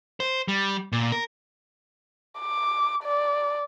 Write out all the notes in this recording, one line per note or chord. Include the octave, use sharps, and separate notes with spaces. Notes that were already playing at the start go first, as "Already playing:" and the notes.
C5
G3
A#2
A#4
D6
D5